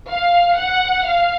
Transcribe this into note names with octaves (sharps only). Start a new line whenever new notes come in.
F5
F#5
F5